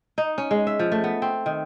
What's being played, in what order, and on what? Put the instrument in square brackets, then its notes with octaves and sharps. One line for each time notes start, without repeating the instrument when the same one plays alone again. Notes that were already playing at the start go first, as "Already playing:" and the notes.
[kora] D#4
C#4
G#3
E5
F3
A3
B3
C4
D#3